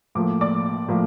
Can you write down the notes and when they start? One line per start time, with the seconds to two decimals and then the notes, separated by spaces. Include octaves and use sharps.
0.15 A2 F3 A#3 D6
0.41 D5 D6
0.88 A2 F3 A#3